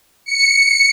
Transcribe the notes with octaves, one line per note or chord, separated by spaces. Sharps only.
C#7